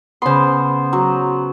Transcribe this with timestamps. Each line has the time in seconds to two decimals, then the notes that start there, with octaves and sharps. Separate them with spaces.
0.22 C#3 B3 C5 C6
0.93 F#3